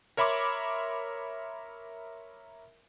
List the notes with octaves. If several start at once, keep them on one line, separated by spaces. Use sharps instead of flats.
A#4 C#5 E5 B5 C6 D6